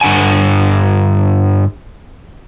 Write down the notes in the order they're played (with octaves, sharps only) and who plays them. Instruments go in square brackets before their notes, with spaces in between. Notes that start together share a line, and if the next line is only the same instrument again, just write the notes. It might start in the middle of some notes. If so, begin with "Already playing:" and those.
[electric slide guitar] G2 D3 F#5 G#5